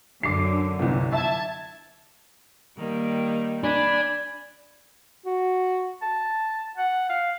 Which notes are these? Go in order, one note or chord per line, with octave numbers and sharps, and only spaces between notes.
F#2 D3 D6 C7
G1 C2
E5 A5 G#6
D#3 G3 A#3
D4 G#5 B5
F#4
A5
F#5
F5